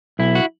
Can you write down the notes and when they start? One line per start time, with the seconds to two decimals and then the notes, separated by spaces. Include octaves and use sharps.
0.19 B1 E4
0.35 F#4